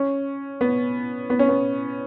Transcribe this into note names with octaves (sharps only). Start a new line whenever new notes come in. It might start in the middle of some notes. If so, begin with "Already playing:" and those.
Already playing: C#4
B3
B3
C#4
B3